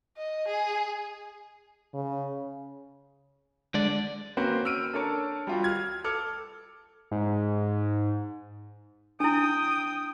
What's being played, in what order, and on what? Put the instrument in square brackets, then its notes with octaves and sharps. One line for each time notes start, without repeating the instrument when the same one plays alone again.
[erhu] D#5
G#4
[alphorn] C#3
[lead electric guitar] D3 D5 [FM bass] G#3
[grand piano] A#3 C4 C#4 F#4 B4 C5
E6 F6 D7 D#7
D4 A4 A#4 C#5 A5
G3 F4 F#4
F6 G#6
A4 D6 F6
[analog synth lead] G#2
[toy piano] D4 E4 [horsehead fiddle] G5 [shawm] D#6